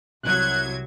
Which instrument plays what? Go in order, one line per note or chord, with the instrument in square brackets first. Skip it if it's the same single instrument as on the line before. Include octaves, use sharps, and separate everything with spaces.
[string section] C2 F#3 G#6 [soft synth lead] F#6